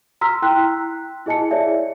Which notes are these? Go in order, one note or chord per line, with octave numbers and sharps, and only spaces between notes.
A#5 C6 E6 F6 B6
E4 G5 C6 F#6
E4 G#4 D#5 G#5 A5 C#7
E4 G#4 C#5 D5 E5